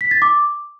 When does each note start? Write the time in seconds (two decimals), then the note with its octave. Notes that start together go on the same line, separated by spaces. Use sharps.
0.01 B6
0.11 A6
0.22 D6